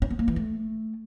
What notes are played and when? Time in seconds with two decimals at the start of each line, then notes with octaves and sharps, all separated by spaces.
0.02 C#4
0.10 B3
0.19 A#3
0.28 E3
0.36 A3